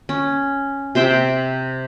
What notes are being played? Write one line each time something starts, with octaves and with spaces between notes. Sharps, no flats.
C#4
C3 C5 E5 G5